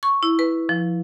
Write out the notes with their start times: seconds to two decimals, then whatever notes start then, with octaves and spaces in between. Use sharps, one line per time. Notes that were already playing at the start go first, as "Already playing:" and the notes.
0.03 C#6
0.23 E4
0.39 B4
0.69 F3